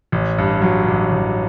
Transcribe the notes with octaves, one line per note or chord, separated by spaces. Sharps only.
A1
G2
F#3
A1
A1